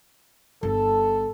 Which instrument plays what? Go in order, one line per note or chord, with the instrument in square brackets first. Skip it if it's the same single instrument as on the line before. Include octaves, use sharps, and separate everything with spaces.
[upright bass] G1 [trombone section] A4